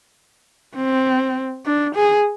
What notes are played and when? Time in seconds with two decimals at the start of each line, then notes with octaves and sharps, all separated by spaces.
0.75 C4
1.66 D4
1.95 G#4